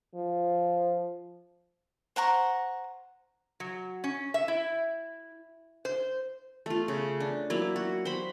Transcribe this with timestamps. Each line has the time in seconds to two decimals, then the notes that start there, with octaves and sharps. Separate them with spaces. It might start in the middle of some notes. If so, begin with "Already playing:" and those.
0.15 F3
2.16 C5 F#5 A#5 C#6
3.60 F#3
4.04 C#4
4.34 E5
4.48 E4
5.85 C5
6.66 A3 F4
6.88 C#3
7.20 D4
7.50 F#3 A#3 E4
7.76 F#4
8.05 C5 B5